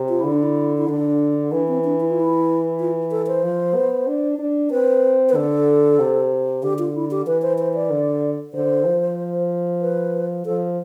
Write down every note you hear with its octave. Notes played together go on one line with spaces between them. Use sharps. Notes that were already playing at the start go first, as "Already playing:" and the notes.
Already playing: C3
F4
D3 E4
D4
E4
E4
D3 D4
E3 D4
C4
D4
E4
F4
E4
F4
A4
C5
F3
B3
D4
D4
C4 B4
B4
D3 A4
C3
D3 G4
F4
E4
G4
E3 B4
C5
C5
D5
D3
D3 C5
F3
B4
F3 A4